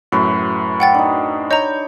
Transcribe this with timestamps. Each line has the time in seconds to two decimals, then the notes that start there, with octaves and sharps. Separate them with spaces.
0.12 F#2 A2 F#4 B4
0.80 F#5 G5 A6
0.94 D4 D#4
1.51 C#5 D#5 A#5 G6